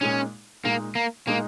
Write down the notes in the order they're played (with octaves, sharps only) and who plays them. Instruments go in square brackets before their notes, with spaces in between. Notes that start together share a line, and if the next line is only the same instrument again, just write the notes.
[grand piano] A#2 G#3 D#4 [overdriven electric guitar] C#4
[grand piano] A#2 G#3 D#4 [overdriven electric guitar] A#3
[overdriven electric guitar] A#3
[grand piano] A#2 G#3 D#4 [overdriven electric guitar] A#3